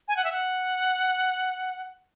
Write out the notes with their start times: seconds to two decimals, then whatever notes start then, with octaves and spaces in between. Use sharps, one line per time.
0.08 G#5
0.17 F#5
0.24 E5
0.32 F#5